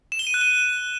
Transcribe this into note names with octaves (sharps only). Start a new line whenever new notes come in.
E7
G7
D#7
F#6
D#7